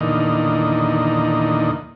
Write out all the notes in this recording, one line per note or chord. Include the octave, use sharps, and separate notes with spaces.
E2 A#2 D3 D#3 D#4